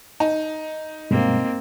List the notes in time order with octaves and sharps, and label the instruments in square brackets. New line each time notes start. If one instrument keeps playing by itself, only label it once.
[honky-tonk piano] D#4
[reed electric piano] G2 B2 G#3 [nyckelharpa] A#3 C4